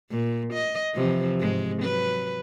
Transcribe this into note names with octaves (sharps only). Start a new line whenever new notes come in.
A#2
D#5
C3 E3 F3
G#2 G#3
F#3 B4